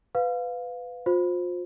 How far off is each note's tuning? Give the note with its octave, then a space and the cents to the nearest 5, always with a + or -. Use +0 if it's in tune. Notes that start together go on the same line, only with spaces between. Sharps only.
B4 +20 F5 +15
F4 +35 C5 +0